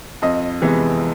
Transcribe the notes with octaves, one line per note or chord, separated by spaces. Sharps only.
F2 D#5
C3 E3 G#3 B3